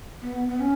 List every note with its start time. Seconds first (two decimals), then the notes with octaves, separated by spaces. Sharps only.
0.22 B3
0.49 B3
0.60 C#4